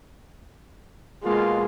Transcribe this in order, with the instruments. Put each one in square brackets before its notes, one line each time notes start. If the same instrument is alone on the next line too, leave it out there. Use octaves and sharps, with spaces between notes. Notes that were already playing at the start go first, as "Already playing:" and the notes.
[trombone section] B2 A#3 F4 [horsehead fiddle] G#3